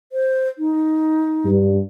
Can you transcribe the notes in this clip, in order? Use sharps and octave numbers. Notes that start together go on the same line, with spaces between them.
C5
D#4
G2